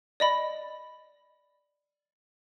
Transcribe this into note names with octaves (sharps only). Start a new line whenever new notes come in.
D5 D#5 B5